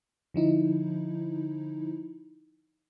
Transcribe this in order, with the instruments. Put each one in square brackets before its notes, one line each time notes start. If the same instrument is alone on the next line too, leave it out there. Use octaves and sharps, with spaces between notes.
[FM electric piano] D3 F3 D#4 E4